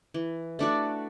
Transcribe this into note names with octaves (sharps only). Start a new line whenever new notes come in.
E3
A3 D4 F#4